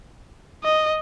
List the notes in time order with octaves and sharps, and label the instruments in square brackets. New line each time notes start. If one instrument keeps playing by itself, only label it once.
[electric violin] D#5